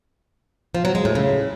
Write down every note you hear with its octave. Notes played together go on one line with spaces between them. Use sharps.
F3
F#3
G#3
A2
C#3